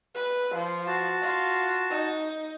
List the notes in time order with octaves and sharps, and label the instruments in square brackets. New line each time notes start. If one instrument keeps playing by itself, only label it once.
[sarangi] B4
F3
[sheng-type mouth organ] F#4 A5
[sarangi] F4
D#4